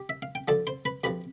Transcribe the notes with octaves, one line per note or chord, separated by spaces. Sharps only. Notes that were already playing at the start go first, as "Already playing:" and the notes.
Already playing: G4
E5
F5
G5
D2 D3 F3 A4 A5
C5 C6
B4 B5
D2 C3 F3 B4 B5